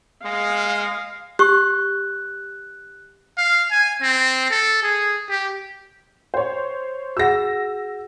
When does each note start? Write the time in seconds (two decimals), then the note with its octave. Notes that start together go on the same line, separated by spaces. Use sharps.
0.24 G#3 F5
1.39 G4 C#6 F#6
3.38 F5
3.71 G#5
4.02 C4
4.51 A4
4.83 G#4
5.29 G4
6.34 C5 C#5
7.17 F#4 G#4 F#5 E6 A#6